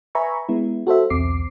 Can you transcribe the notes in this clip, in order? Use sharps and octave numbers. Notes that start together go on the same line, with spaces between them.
B4 E5 G#5 A#5 B5 C#6
G#3 B3 E4
F#4 A4 C5 E5
B1 E2 C4 D6 C7